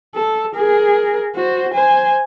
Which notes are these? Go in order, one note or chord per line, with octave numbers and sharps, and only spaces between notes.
A4
G#4 A#4
F#4 C5
C5 G#5